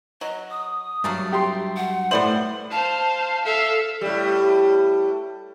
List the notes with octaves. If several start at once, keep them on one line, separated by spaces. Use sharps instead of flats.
F#3 D#5
D#6
G2 F#3 A3 A#3 D4
G4 G5 C6
F#5
A2 G3 B3 C5 D5 F#7
C5 F5 A5
A4 E5 F5
A2 G3